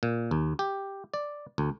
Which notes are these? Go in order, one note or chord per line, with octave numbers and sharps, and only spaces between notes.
A#2
D#2
G4
D5
D2